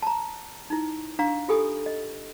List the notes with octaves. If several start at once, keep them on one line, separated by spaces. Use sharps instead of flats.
A5 A#5
D#4 E4
D4 F5 A#5 C#6
F4 G4 A4 G#5 D#6
D#5